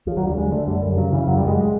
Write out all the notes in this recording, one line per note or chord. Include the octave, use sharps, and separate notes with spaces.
D#2 F3
F#3
D3
G3
D3 G#3
D3 A3
F#2 G3
F#2
C#3 F#3
C#3 E3
F#2 F#3
G3
F#2 G#3